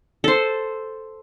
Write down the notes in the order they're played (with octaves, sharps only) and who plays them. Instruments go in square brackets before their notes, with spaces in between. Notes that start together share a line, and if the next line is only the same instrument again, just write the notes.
[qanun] A4 C5